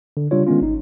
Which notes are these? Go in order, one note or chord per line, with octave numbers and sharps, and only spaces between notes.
D3
C#3 G3 D4 F4 C#5
D#3 G#3 B3 C#4 F4
G#1 D#4